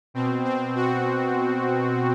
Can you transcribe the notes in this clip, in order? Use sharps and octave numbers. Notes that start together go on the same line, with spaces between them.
B2 C4
C4
F#4